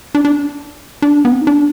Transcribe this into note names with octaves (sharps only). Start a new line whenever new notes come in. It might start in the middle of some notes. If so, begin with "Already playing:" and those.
D4
D4
D4
B3
C4
D#4
D4